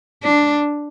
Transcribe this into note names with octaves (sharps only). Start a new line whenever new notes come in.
D4